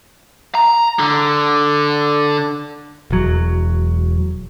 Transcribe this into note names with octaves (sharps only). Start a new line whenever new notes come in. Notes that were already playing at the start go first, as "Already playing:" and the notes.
A#5
D3
E1 F#3